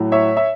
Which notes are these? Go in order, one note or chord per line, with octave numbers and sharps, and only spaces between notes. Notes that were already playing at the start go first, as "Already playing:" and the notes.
Already playing: A2 F#3
C#5 E5
E5